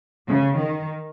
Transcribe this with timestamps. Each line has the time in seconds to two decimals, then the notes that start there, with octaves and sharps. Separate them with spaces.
0.28 C#3
0.56 D#3